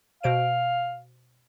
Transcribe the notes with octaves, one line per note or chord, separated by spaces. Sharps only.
B2 C5 F5 D7